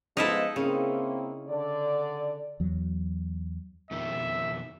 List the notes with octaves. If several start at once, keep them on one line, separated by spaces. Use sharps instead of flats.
F3 G#3 B3 D#4 E4 A4
C#3 A#3 C4 E4
D3 D5
E2 F#3
F2 B2 D#3 E5